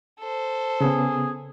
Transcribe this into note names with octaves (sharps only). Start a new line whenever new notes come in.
A4 C5
C#3 B3 G#4